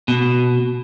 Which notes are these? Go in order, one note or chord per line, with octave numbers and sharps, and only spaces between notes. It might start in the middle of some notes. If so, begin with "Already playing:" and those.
B2